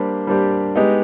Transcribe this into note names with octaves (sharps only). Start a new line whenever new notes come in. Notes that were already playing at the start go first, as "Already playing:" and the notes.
Already playing: G3 A#3 D4 G4 C5
G3 A#3 D4 G4 C5
G#3 B3 D#4 G4